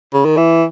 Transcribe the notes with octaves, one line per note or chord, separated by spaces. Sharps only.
C#3
D#3
E3